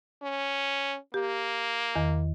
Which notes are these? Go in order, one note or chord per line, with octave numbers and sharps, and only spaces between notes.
C#4
A#3 G4
E2 D#3